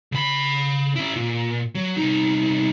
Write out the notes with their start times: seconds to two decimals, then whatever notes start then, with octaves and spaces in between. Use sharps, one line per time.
0.12 C#3 B5
0.96 C#4 E4
1.16 A#2
1.75 F#3
1.97 C2 D#4